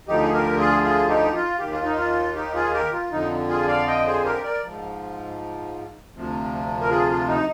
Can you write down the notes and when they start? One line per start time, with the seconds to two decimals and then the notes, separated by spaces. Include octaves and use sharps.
0.07 D2 D3 F3 D#4 G4
0.22 G#4
0.33 G4 A#4
0.58 F4 G#4
0.83 F4 G#4
1.08 D#4 G4
1.34 F4
1.59 D#2 D#3 G4
1.72 F4
1.84 D#4
1.96 F4
2.35 D#4 G4
2.54 F4 G#4
2.73 G4 A#4
2.92 F4
3.11 F2 D3 F3 D#4
3.49 F4 G#4
3.67 D5 F5
3.87 D#5 G5
4.05 G#4 C5
4.24 G4 A#4
4.43 A#4 D5
4.63 G#2 F3
6.14 D2 C3 F3
6.81 A#4
6.90 F4 G#4
7.09 F4
7.28 D#4